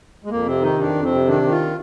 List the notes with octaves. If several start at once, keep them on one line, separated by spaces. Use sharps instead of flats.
G#3
F2 A#3
C3 C4
D#3 D#4
F2 D4
F2
C4
C3
D#3 D4
D#3
F4